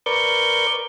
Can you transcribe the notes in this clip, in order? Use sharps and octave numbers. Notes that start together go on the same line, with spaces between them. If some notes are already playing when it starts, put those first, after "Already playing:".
A#4 B4 D5 C#6 G6